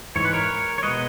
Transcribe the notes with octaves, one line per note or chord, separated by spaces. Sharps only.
G#2 E3 G#3 C#5
B4
A#4 C#5
C#5
B2 G#3 B4 D#5